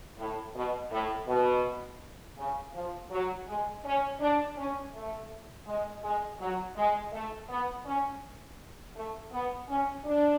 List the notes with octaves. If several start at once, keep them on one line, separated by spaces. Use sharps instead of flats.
A2
B2
A2
B2
C#3
F3
F#3
G#3
C#4
D4
C#4
A3
G#3
G#3
F#3
G#3
A3
B3
C#4
A3
B3
C#4
D4